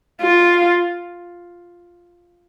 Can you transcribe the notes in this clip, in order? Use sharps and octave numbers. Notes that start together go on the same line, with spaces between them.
F4